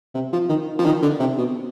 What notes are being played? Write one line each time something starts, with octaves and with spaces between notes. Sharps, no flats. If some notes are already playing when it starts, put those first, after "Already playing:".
C3
F3
D#3
F3
D#3
D3
C3
B2